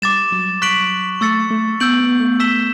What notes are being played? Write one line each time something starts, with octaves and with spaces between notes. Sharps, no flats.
G3 D6 A6 E7
F#3
C#6 F#6 B6 D7 F#7
A3 C#6 E6 A6 C#7
A3
B3 E6 G6 D7 F#7
B3
A3
A3 E6 B6 E7 G7